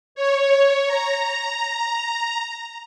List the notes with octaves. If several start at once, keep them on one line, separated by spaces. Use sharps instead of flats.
C#5
A#5